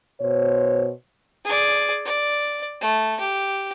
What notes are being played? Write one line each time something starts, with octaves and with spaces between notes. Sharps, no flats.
B2 C5 C#5
G#4 D5
D5
A3
G4